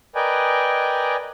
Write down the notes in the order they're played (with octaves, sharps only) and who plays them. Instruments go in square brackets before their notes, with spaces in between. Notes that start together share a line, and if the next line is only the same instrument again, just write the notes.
[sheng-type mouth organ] A#4 B4 D5 D#5 G5 G#5